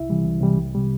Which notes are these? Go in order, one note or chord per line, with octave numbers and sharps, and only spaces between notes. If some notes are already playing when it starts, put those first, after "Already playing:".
Already playing: C2 E4 E5
C3 E3 G3
C2
C3 E3 G3
C2
C3 G3